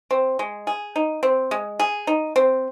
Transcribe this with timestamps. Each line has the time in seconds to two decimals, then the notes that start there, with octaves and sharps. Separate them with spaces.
0.11 C4
0.39 G#3
0.67 G#4
0.96 D#4
1.23 C4
1.51 G#3
1.80 G#4
2.07 D#4
2.36 C4